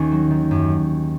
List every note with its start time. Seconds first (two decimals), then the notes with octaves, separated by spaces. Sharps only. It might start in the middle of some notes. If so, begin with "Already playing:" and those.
Already playing: D#2 D#3 C#4
0.11 F#3
0.31 D#3
0.51 F#2